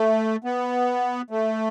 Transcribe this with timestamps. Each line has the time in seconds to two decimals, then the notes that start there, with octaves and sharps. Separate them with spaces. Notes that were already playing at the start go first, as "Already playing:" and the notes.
Already playing: A3
0.44 B3
1.30 A3